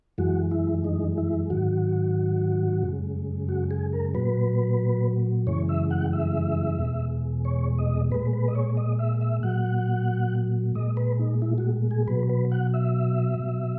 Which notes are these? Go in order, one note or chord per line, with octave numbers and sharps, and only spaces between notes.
F#2 E3 G#3 F#4
E4
D#4
E4
G#2 D#3 F#3 F#4
F#2 C#3 G#3
F#4
G#4
A#4
A#2 F#3 B4
F#2 C#3 E3 G#3 C#5
E5
F#5
E5
E2 B2 G#3
C#5
D#5
A#2 G#3 B4
B4
D#5
C#5
D#5
E5
E5
A#2 F#3 F#5
A#2 G#3 D#5
B4
D#4
E4
F#4
G#4
B2 F#3 B4
B4
F#5
E5
B2 F#3